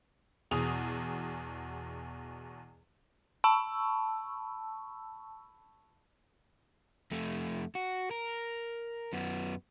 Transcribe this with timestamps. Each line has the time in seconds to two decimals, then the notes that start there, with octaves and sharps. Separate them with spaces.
0.51 E2 B2 G#4 D#6 F7
3.44 A5 B5 C#6 E6
7.11 F2 A3
7.75 F#4
8.11 A#4
9.13 F#2 B3